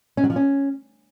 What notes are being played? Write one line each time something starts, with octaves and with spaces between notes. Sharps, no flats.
C#4
F#3
F3
C#4